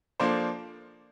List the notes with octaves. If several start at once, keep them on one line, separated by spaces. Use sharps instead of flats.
F3 A#3 D4 A4 C5